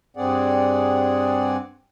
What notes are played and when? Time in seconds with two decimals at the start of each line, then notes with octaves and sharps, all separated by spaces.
0.17 G2 C4 G#4 D5 F#5